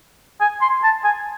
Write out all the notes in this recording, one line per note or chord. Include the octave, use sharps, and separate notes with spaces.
G#5
C6
A5
G#5